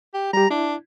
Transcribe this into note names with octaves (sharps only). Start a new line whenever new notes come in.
G4
G3 G4 A#5
D4 E4